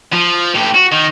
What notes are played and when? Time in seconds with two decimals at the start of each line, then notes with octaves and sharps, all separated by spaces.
0.13 F3
0.55 A2 G4
0.75 F#4
0.92 D#3